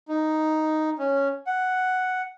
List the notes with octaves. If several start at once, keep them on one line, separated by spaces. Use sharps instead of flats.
D#4
C#4
F#5